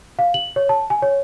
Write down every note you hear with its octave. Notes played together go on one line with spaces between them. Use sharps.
F5
F#7
C#5
A5
G#5
C#5